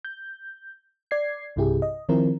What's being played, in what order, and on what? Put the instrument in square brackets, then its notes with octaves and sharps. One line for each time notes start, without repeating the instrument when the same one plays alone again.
[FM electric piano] G6
D5 G#6 C7
B1 G2 C3 E4 G4 G#4
D#5
D#3 F3 C4 E4 A#4